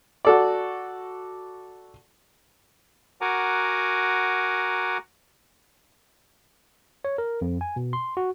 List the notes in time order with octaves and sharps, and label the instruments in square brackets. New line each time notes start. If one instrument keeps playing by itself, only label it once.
[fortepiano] F#4 A4 D5
[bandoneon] F#4 A#4 F#5 G#5 A#5 D6
[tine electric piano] C#5
A#4
F2
G#5
B2
C6
F#4